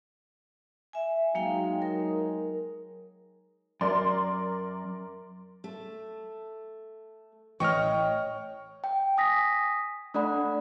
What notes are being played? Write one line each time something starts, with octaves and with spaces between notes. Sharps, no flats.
E5 G#5
F#3 G#3 A#3 D#4 F5 G5
A#4
F#2 A#4 D5 C6
A3
A1 A2 E3 C#5 D#5 G5 C#6 F6
G5
G#5 D#6 A#6 B6
A3 D4 A4 D5 F#5 B5